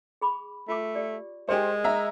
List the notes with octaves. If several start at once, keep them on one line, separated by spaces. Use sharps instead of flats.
G#4 B5 D6
A3 F4 D6
G4 D5
G#3 G4 A#4 C5 G#5
E5 A#5